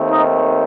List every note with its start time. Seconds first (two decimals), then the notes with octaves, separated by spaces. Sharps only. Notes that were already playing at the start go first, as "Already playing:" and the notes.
Already playing: D#2 D#3 A3 C4
0.11 D#4